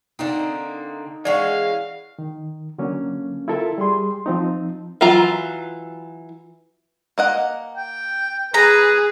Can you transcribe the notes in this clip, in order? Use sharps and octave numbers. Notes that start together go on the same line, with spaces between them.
D3 A#3 C4 D#4
E3 G#3 C#4 D5 F5 F#5
D#3
D3 F#3 A#3 C#4
E4 F4 A4 A#4 E5
G3 G#4 C6
F3 C4 D#4
E3 F#3 F4 A#5
A#3 D#5 F#5
G5
G#4 B4 A#5